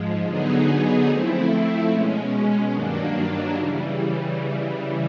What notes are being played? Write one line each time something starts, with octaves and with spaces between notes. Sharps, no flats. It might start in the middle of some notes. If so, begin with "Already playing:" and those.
Already playing: G#2 F3 G#3
D3 F#3 B3 D#4 G#4
F3 A3 C4 E4
B2 G#3 C#4
G2 D#3 F#3 A#3 D4
C#3 E3 G3